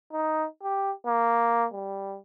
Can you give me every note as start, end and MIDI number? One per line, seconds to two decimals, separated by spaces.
0.13 0.45 63
0.63 0.91 67
1.07 1.65 58
1.73 2.16 55